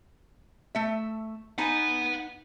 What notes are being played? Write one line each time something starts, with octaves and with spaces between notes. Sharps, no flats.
A3 E5
D#4 F#5 G#5 B5